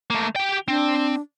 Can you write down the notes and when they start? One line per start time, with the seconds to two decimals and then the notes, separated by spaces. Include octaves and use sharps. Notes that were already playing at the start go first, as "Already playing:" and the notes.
0.10 A3 A#3
0.36 G4 G5
0.68 C4 D4